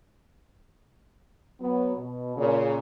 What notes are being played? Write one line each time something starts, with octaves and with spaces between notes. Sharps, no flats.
F#3 B3
B2
A#2 C#3